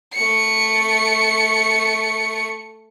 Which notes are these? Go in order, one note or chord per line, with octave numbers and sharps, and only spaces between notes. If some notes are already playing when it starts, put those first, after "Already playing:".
A3 C#7